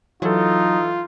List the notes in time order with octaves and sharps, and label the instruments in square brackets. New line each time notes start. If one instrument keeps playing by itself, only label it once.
[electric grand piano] E3 A4 [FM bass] F#3 [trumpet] D#4 [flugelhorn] F4